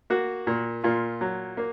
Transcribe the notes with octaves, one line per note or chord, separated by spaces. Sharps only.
A#3 F#4
A#2
A#2 F4
F#3
A#3